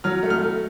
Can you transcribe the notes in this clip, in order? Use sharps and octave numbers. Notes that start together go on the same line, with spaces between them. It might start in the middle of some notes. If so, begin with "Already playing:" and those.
F#3 F6
A3
F6
A3